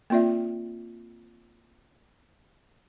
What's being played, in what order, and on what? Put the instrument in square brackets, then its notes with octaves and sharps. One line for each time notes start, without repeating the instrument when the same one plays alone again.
[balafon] A#3 C4 F4 D5 E5